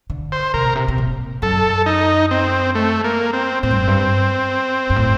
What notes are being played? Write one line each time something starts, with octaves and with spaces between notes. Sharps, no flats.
D3
C5
C3 A#4
A#2
C3
C3
A#2
F#2 A4
D#4
C4
A3
A#3
C4
A2 C4
G2
F#2
G2
G2
A2